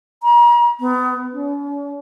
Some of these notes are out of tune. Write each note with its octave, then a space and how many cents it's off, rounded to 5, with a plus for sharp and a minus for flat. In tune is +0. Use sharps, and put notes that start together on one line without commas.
A#5 +40
B3 +30
C#4 +45